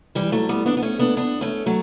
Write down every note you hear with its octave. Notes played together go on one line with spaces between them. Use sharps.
E3 G3
F#3 A3
G3 B3
B3 D4
B3
A3 C#4
B3 D4
B3 D4
A3 C#4
F#3 A3